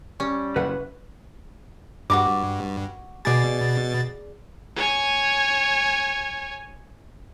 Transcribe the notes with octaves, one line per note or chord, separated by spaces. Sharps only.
G3 C#4
F#1 B4 E5 F#5
G2 F#4 A#4 D6
B2 G#4 D5 A6
C#5 G#5